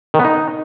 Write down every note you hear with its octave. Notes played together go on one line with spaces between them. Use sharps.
D#3
B3
D#4